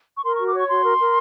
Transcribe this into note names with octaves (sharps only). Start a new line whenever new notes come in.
C#6
A#4 C6
F#4 C#6
D6
C#5 C#6
F#4 C6
A#4
A#4